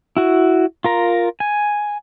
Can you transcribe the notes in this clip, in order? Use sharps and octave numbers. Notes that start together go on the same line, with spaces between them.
E4 F#4
F4 A#4 A#5
G#5